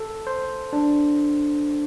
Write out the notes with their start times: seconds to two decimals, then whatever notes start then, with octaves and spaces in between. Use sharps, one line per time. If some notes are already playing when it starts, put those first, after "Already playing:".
Already playing: A4
0.27 C5
0.73 D4